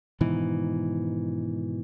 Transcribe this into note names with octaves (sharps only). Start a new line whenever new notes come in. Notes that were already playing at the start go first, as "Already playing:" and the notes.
G#2 B2 D#3 E3